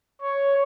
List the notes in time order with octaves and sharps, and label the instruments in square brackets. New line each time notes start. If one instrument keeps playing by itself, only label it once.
[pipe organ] C#5